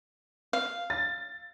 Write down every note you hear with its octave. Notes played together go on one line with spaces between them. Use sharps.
F5
A6